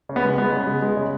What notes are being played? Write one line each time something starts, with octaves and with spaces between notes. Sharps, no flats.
C#3
B3
G#3
G#3 B3
C#3
G#3
G#3
C#3